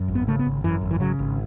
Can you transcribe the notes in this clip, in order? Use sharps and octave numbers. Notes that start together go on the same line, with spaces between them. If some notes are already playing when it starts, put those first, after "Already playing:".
Already playing: F#2
G#1
B3
C#3 A3
B3
G#1
F#2 E3
G#1
E3
C#3 F#3
G#1